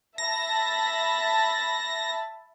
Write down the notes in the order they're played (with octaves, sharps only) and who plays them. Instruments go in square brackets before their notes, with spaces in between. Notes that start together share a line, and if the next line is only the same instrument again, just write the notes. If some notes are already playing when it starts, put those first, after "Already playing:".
[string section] E5 A5 B5 [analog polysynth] A#6